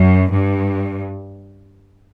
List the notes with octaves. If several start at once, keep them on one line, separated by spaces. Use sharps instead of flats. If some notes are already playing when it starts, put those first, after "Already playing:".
Already playing: F#2
G2